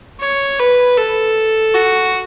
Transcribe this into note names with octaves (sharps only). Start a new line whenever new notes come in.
C#5
B4
A4
F#4